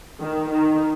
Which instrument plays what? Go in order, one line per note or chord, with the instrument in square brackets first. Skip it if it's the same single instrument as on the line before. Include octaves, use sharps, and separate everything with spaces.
[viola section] D#3
D#3